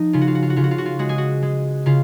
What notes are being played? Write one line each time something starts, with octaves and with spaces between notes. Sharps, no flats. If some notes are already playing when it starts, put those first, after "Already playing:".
Already playing: F3 D#4
C#3 F4
F#4
F4
F#4
F4
F#4
C#3 F4
F#4
F4
F#4
F4
G#3 F#4
G#4
F#4
G#3
C#3 F4